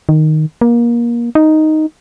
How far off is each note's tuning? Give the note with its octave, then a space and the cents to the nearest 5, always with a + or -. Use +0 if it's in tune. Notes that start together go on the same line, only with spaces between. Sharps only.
D#3 -5
A#3 +25
D#4 +0